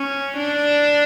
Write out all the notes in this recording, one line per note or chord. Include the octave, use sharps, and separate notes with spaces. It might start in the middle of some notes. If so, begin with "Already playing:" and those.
Already playing: C#4
D4